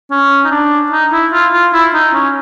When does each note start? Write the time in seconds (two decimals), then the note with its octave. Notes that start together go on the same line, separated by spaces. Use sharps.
0.11 C#4
0.44 D#4
0.51 D4
0.92 D#4
1.12 E4
1.33 F4
1.53 F4
1.73 E4
1.94 D#4
2.14 C#4